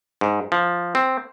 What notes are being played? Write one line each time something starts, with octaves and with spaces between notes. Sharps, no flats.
G#2
F3
C4